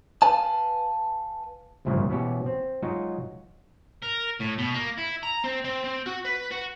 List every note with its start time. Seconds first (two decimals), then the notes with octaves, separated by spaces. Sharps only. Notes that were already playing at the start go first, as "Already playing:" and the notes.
0.22 B4 F5 G#5 A5
1.85 G#1 D2 G2 A#2 C#3 F3
2.10 B2 E3 C#4 F#4 G4
2.46 C4
2.82 F#3 G#3 D#4 F4 F#4
4.02 A#4
4.40 A2
4.58 B2
4.74 A#3
4.97 E4
5.23 A#5
5.44 C4
5.65 C4
5.84 C4
6.06 F#4
6.25 B4
6.51 F#4